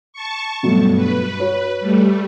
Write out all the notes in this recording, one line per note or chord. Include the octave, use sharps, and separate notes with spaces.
A5 C#6
G2 B2 F#3 A3
B4
F#4 C#5
G3 A3